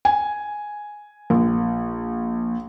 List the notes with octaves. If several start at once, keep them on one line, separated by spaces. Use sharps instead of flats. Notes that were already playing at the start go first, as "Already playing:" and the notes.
G#5
A#1